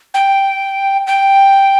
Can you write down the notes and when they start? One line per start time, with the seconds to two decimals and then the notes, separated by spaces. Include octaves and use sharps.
0.14 G5
1.07 G5